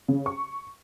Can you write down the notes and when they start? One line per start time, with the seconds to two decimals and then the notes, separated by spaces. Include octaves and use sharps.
0.08 C#3
0.26 C#6